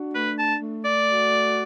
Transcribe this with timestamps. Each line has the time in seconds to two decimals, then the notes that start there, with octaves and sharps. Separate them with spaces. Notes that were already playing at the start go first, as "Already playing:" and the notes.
Already playing: D4 F#4
0.14 A3 B4
0.39 A5
0.61 A3
0.85 D5
1.09 F#4